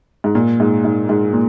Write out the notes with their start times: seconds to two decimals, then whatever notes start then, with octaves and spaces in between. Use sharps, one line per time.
0.24 G#2
0.35 A#2
0.60 G#2
0.84 G#2
1.09 G#2
1.33 A#2